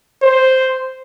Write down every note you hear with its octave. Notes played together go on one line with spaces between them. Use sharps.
C5